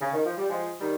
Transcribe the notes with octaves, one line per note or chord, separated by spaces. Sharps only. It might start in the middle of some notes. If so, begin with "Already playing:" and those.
C#3
D#3
F3
G3
F3 G#3
D#3 G3